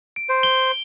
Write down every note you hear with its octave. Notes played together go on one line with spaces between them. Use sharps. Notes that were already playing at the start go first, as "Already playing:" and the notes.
D7
C5
G7